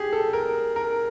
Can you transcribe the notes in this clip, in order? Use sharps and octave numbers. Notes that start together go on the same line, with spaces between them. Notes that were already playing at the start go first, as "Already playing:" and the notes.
Already playing: G4 G#4
A4
A#4
A#4